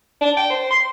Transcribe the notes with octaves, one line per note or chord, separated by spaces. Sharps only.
D4
G5
C5
C6